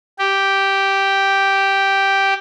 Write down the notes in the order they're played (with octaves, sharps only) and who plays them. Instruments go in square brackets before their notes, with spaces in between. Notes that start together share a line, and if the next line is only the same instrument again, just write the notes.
[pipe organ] G4